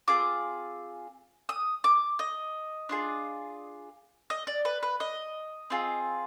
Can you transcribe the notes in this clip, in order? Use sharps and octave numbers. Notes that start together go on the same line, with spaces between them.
C4 F4 G#4 D6
D#6
D6
D#5
D4 F4 G#4
D#5
D5
B4
B4
D#5
C4 F4 G#4